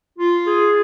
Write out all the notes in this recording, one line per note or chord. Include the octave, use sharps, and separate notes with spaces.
F4
G#4